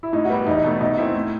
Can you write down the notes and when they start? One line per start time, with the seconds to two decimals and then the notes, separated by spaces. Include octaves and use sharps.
0.03 E4
0.13 A2 D#4
0.25 F#4
0.29 G3 B3
0.46 E2 D#4
0.64 B2 A3
0.81 B2 D#4
0.98 A3 C4 E4
1.15 A2